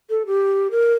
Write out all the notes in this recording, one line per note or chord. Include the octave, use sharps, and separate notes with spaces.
A4
G4
A#4